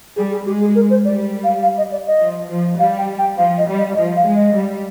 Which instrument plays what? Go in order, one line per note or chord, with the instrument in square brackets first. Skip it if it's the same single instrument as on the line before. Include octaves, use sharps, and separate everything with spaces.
[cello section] G3 [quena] G#4
[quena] G#4
[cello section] G#3 [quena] G4
[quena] G#4
A#4
C5
[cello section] G3 [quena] D5
[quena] F5
F5
D#5
D5
D#5
[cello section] F3
F3
[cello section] G3 [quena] F5
[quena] G5
G5
[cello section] F3 [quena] F5
[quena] D#5
[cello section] G3
[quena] D#5
[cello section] F3 [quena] D#5
[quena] F5
[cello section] G#3
[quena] D#5
[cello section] G3